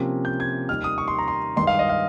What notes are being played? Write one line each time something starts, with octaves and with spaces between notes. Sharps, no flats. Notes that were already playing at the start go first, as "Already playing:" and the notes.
Already playing: C3 F3 A#3 C#4 F4
G6
G#6
D#2 D#3 G3 F6
D#6
C#6
C6
A#5
C6
G2 D#3 G#3 C6
F5
D#5
F5